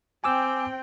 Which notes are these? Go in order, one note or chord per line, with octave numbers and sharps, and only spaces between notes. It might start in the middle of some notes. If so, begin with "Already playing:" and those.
C4 G5 G#5 D6 E6